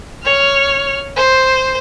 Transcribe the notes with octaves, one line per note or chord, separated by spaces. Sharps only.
C#5 F6
C5